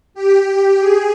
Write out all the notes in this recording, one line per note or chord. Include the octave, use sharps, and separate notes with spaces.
G4
G#4